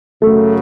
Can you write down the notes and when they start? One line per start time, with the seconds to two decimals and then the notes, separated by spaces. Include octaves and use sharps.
0.22 F#2 C#3 F#3 A3